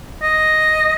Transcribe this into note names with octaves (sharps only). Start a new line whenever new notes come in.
D#5